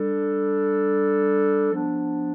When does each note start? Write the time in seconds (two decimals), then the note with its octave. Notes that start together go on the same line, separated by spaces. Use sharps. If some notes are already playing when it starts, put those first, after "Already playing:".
Already playing: G3 D4 A4
1.73 F3 B3 D4